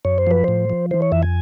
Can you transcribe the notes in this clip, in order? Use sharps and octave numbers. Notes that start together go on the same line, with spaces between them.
F#2 C#5
C5
F3 B4
A2 C5
F3
E3 C5
C#5
F2 E5
G#5